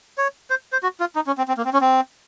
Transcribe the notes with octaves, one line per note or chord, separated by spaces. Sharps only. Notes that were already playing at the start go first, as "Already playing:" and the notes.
C#5
C5
C5
F#4
F4
D#4
C#4
C4
C4
A#3
C4
C#4
C4